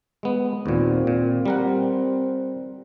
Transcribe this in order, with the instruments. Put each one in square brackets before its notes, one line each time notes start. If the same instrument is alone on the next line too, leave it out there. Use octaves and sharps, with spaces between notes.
[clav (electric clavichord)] G#3 B3
[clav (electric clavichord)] D#2 A#2 [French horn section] C4
[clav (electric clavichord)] A#2
G3 A#4 F#5